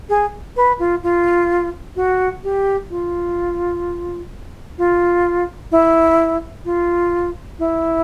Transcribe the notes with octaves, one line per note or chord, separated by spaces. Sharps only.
G#4
B4
F4
F4
F#4
G4
F4
F4
E4
F4
E4